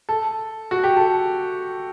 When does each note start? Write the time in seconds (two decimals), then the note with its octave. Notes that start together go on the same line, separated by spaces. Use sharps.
0.09 A4
0.71 F#4
0.84 G4
0.97 A4